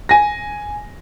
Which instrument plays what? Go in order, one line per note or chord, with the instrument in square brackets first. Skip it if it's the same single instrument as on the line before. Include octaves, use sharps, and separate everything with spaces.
[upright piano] G#5 A#6